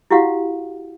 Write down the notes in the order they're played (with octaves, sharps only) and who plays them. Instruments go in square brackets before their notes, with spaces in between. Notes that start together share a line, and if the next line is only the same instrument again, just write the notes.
[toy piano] E4 F#4 G4 F5 F#5